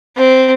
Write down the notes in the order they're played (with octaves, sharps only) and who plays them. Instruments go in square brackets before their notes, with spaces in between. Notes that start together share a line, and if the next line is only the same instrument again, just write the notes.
[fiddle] C4